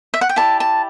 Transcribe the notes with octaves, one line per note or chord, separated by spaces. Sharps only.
E5
F#5
G5
E4 G4 D5 A5
A5